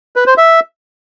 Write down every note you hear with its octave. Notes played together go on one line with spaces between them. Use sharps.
B4
C5
E5